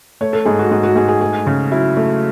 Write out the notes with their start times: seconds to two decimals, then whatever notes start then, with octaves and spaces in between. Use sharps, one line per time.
0.21 A3 C#5
0.33 A4
0.45 G#2 G#4
0.59 F#4
0.71 G#2 G#4
0.83 F#4
0.96 G#2 G#4
1.08 G#4
1.21 A3 G#4
1.47 C#3
1.71 F#3 E4
1.97 A3